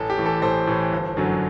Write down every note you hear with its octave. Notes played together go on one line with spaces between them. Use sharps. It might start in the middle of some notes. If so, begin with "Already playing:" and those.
Already playing: A1 A4
G4
A2 E3
A4
A1 A4 C5
A2 E3
G1
F#2 D3 F#3